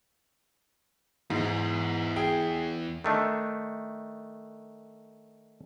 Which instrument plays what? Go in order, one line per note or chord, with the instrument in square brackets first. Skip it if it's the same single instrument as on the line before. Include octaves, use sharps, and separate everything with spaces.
[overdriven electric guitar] E2 [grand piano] G#2
[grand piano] G#4 G5
[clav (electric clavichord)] D#3 A3 D4